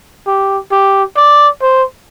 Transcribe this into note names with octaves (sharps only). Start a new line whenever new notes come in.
G4
G4
D5
C5